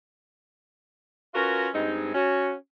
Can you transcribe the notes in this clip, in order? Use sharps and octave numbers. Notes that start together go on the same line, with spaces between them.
C#4 F4 F#4 A#4 B4
G2 G#3 C4 D#4
C#4 F#4